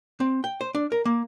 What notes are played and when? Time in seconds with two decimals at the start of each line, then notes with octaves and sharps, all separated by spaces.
0.20 C4
0.44 G5
0.61 C5
0.75 D4
0.92 A#4
1.05 A#3